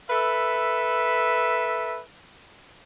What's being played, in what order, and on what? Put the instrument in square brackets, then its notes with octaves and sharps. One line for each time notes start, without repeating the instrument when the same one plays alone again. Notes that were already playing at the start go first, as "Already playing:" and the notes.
[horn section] A4 B4 E5